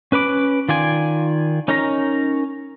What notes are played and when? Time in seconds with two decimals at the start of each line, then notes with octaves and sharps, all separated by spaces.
0.12 C#4 B4 B5 D6
0.69 D#3 F4 D5 G#5
1.68 C#4 D#4 A#4 C#5 A#5